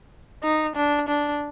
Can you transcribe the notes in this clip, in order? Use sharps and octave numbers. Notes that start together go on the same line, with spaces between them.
D#4
D4
D4